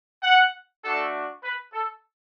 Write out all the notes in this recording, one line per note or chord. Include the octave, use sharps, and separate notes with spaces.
F#5
A3 D4 F#4 A4
B4
A4